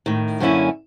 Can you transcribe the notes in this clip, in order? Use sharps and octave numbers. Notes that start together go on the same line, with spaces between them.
A2 D#3
F#2 D3 A#3 C#4 E4 G#5